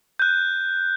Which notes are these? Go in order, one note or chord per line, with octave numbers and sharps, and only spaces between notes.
F#6 G6